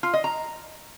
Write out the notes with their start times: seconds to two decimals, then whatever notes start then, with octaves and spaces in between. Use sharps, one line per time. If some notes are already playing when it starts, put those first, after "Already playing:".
0.03 F4
0.14 D#5
0.24 A#5